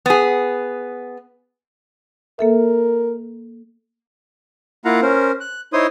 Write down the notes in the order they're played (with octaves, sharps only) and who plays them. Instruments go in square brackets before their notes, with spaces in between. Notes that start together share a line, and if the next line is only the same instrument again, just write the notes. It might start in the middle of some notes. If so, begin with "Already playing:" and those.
[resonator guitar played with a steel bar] B3 G#4
[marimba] A#3 A4 E5 [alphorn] A#4
[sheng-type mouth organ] A#3 E4 F4 F5 F#5 A#5
C#4 A#4 C5
F#6
D#4 E4 C5 C#5 C6 D#6